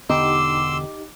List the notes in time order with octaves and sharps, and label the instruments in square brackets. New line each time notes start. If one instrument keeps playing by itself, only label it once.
[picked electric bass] E1 D3 B3 [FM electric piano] D#4 G4 [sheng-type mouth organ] C6 E6 [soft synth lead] D6